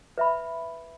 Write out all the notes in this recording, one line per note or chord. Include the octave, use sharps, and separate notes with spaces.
B4 E5 B5